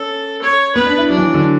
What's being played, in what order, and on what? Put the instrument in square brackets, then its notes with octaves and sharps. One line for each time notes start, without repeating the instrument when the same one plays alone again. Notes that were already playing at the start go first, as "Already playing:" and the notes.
Already playing: [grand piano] C#4 [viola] A4
[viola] C#5
[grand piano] B3 [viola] B4
[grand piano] D4
E4
[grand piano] F#3 [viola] D4
[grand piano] E3
F#3
D3